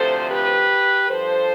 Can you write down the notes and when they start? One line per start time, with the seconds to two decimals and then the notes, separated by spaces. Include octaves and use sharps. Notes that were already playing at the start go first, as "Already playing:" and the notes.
Already playing: D2 C3 F3 A4 C5
0.29 G4 B4
1.10 G2 F3 A4 C5